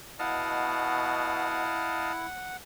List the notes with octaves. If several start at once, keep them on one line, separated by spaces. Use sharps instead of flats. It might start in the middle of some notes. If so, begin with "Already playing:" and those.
B2 E4 D#5 F5 F#5 A5